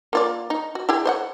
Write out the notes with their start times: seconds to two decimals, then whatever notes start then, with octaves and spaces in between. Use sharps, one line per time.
0.13 A#3 F4 D5
0.50 D#4
0.75 F#4
0.89 E4 G4 G#4
1.05 C5 D#5 F#5